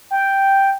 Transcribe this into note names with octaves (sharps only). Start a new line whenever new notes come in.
G5